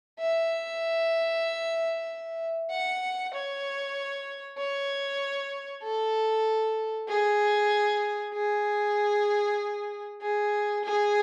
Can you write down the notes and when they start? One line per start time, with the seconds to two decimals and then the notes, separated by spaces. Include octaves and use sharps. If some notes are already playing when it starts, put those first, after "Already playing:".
0.19 E5
2.70 F#5
3.33 C#5
4.58 C#5
5.83 A4
7.08 G#4
8.33 G#4
10.21 G#4
10.84 G#4